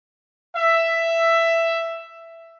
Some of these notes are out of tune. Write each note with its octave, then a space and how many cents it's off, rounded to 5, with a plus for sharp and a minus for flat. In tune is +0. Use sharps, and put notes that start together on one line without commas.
E5 +10